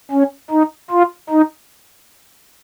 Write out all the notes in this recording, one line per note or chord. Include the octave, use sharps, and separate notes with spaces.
C#4
D#4
F4
D#4